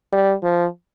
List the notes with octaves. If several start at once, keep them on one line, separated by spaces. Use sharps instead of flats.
G3
F3